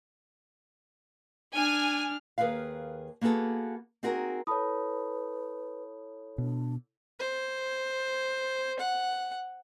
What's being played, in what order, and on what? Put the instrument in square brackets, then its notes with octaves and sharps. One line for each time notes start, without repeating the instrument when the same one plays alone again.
[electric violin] D4 F6 [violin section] G#5
[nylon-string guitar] D#2 G#4 A#4 B4 F5
A#3 B3 F#4 G#4 A4
C4 D#4 F#4 G#4 A#4
[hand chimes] E4 A4 C#5 [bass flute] B4 [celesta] A5 B5 D#6
[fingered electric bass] B2 [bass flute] D4
[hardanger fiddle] C5
F#5